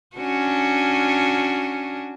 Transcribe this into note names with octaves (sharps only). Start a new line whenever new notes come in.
C#4 D4 F#4